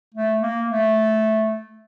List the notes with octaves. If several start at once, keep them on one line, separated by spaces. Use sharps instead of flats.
A3
A#3
A3